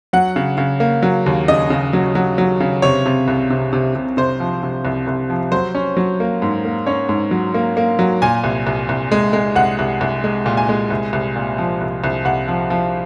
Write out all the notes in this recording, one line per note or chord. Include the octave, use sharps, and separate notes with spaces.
F#3 F#5
C#3
C#3
A#3
F#3
D#2
C#3 D#5
C#3
F#3
F#3
F#3
C#3
C3 C#5
C3
C2
C3
C3
C3
C3 C5
F3
C3
C2
C2
F3
F#3 C5
C#4
F#3
A#3
G#2
A#3
C#4 C#5
G#2
F#3
A#3
A#3
F#3
A#2 G#5
C2
C2
C2
G#3
G#3
C2 F#5
C2
C2
G#3
A#2
G#5
G#3
C2
C2
A#2
F3
C2
C2
C2 F#5
F3
F3